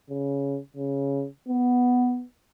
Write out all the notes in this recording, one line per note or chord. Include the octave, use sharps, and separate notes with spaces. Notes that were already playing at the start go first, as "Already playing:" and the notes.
C#3
C#3
B3